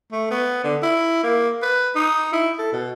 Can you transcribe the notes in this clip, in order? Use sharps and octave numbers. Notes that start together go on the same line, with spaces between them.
A3
B3
D3
E4
A#3
B4
D#4
E4
A4
B2